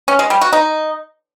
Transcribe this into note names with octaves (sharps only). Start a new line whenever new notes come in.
C#4
G#3
G3
F#4
D#4